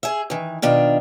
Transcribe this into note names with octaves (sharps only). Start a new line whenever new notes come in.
G#4 E5
D#3 E3
B2 D#3 D4 F4